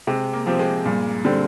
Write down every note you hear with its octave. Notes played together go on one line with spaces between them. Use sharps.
C3 G#3
A#3
F3 C4 G4
G#3
G2 A#2
D3 G3 C4